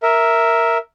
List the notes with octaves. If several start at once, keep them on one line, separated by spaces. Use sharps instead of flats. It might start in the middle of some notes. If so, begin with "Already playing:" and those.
A#4 E5